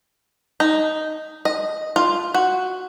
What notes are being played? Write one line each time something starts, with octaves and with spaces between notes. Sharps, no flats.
D#4
D#5
F4
F#4